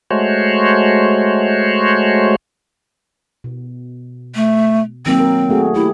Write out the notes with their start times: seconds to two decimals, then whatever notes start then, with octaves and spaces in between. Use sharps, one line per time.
0.11 G#3 A3 F#4 C5 C#5
3.44 B2
4.35 A3
5.06 D#3 F#3 A#3 C4
5.20 A#4
5.50 A3 F#4 G#4
5.74 A3 E4 G4